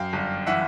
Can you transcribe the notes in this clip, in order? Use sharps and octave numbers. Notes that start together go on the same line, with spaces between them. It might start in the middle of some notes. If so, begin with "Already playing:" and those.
Already playing: F#2 F5 G5
G1
E3 E5 F#5